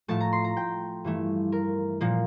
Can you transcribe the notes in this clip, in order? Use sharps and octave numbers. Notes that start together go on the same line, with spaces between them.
A2 F3 A3 A5
A#5
C6
A#5
G5
G2 E3 A3
A#4
A#2 F3 A#3